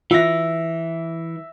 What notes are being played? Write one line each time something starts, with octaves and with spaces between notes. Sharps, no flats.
E3 F4 E5 A#6